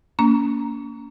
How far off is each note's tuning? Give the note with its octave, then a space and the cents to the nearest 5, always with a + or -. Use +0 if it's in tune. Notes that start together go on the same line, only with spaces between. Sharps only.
A#3 -10 C#4 +40 A#5 +0